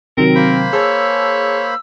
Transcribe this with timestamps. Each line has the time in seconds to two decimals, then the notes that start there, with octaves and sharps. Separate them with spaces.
0.17 C3 D#3 F#3 C4 A#4
0.35 A#3 C5 B5
0.73 G#4 C#5 A5 E6